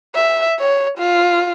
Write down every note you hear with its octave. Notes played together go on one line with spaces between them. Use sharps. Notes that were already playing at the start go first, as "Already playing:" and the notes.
E5
C#5
F4